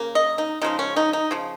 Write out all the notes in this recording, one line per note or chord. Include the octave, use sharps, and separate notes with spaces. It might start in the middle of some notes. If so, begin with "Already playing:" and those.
Already playing: C#3 A#3
D#5
D#4
C#3 F3 G#3 D#4
C#4
D#4
D#4
C#3 F3